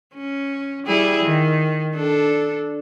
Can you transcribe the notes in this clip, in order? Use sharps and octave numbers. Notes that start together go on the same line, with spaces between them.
C#4
G3 E4 G#4
D#3
D4 A4